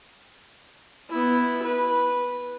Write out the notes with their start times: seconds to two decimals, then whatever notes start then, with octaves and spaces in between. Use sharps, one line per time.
1.10 B3 E4
1.63 B4